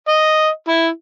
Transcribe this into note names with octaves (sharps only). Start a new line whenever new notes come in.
D#5
E4